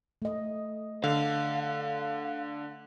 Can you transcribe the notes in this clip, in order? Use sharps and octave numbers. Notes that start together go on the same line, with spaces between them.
A3 D#5
D3 F5